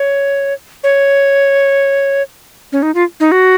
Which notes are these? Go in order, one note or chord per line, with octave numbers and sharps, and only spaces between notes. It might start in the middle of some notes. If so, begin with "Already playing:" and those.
Already playing: C#5
C#5
C#4
D#4
F4
D#4
F#4